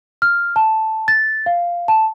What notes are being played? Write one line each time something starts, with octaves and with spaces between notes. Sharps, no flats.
F6
A5
A6
F5
A5